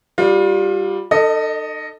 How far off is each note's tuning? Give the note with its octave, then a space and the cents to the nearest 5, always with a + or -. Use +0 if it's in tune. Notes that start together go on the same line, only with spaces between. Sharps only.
G3 +0 F4 +30
D#4 -40 A4 +25 D#5 +0